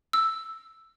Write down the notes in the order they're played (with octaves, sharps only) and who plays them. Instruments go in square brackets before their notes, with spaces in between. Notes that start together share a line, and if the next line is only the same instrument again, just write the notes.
[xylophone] E6